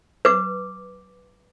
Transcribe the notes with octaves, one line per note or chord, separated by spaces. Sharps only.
B4 D6